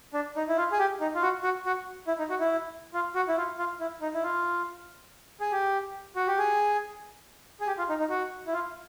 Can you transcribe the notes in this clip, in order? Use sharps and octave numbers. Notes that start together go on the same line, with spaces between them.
D4
D#4
E4
F4
G#4
G4
D#4
F4
F#4
F#4
F#4
E4
D#4
F#4
E4
F4
F#4
E4
F4
F4
E4
D#4
E4
F4
G#4
G4
F#4
G4
G#4
G#4
G4
F4
D#4
D#4
F#4
E4
F4